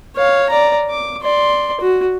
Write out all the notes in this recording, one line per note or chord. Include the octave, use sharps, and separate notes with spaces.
C#5 F5
D5 A#5
D6
D5 C6
F#4